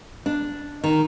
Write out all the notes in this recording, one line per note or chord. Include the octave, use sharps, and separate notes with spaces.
D4
D#3